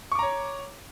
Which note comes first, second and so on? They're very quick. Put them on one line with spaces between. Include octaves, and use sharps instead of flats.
C#6 D6 A#5 C#5